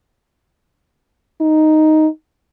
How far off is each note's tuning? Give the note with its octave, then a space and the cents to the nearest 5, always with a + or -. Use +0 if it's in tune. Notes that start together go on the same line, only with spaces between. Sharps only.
D#4 +0